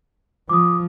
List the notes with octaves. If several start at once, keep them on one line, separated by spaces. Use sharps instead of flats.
F3 D6 D#6